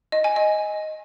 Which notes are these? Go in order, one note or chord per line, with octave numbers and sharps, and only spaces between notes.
D#5
G#5
D#5